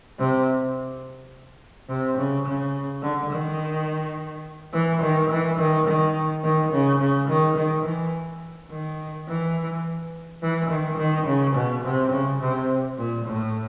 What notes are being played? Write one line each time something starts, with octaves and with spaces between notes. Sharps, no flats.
C3
C3
C#3
C#3
D3
D#3
E3
D#3
E3
D#3
D#3
D#3
C#3
C#3
D#3
D#3
E3
D#3
E3
E3
D#3
D#3
C#3
B2
C3
C#3
C3
A#2
A2